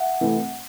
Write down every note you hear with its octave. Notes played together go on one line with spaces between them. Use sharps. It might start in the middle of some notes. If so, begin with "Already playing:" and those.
Already playing: E5 F#5
C3 E3 A3 C4